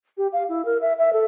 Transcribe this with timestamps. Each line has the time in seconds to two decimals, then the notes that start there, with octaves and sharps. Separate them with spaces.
0.18 G4
0.33 F5
0.49 E4
0.65 A#4
0.81 E5
0.98 E5
1.13 A4